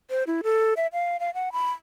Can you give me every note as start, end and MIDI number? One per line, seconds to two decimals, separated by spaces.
0.10 0.24 72
0.27 0.41 64
0.43 0.74 69
0.77 0.87 76
0.93 1.17 77
1.20 1.33 77
1.34 1.52 78
1.52 1.71 83